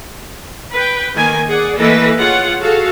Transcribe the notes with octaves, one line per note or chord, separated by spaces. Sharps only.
B4 G5
D#3 A#3 G#5
G#4 D5 F#5
E3 A3 A#3 A4 B4 D#5
F4 G#4 C#5 F#5
F#4 G#4 A4 F5